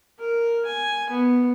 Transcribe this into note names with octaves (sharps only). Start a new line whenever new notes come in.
A#4
G#5
B3